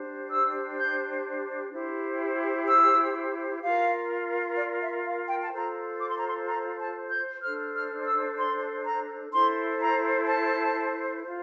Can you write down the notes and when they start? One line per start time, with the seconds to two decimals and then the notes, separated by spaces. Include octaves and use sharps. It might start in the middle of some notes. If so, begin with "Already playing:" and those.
Already playing: D4 G4 C5
0.30 E6
0.78 G6
1.72 E4 G4 C5
2.67 E6
3.62 F4 A#4 F5
4.57 D5
4.81 E5
5.05 F5
5.28 G5
5.42 A5
5.53 F4 A4 C5 A#5
5.99 D6
6.08 C6
6.16 A#5
6.25 C6
6.47 A#5
6.79 A5
7.10 G6
7.42 D4 A4 C5 F6
7.74 F6
8.05 E6
8.37 C6
8.84 A#5
9.31 E4 A4 C5 C6
9.80 A#5
10.27 A5
11.22 F4 C5